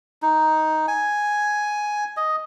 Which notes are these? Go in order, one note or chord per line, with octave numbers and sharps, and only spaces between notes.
D#4
G#5
D#5